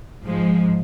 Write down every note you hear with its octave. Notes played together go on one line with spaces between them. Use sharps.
G#2 F3 G#3